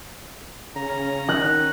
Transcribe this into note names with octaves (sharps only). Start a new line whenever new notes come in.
C#3 C#4 A#5
D#3 F#6